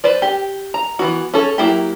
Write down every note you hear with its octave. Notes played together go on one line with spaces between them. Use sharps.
B4 C5 D5
G4
A#5
E3 B3 F#4
C#4 G#4 A4
F#3 A#3 E4 G4